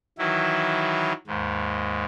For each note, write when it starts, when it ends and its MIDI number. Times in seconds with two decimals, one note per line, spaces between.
0.18 1.12 51
0.18 1.12 52
0.18 1.12 54
0.18 1.12 64
1.27 2.05 39
1.27 2.05 44